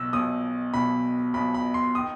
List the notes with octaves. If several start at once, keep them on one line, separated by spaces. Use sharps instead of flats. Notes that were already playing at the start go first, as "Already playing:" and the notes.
Already playing: B1 B2 E6
B1 B2 D#6
B1 B2 B5
B1 B2 B5
B5
C6
D#3 D#6